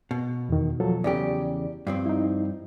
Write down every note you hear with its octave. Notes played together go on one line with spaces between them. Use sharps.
B2
E2 D#3
F3 F#3 A4
E2 C#3 G4 D5
G2 F3 C4
D#4 E4